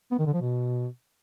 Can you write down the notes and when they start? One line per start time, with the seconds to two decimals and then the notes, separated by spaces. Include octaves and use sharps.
0.11 B3
0.19 D#3
0.26 D3
0.34 F3
0.41 B2